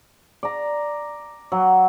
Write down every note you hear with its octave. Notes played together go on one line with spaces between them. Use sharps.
D5 A#5
F#3